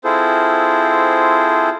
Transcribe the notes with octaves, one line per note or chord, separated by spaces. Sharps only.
C4 E4 F4 G#4 A4 C5